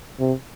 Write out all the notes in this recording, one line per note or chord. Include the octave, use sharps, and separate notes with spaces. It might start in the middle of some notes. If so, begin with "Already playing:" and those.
C3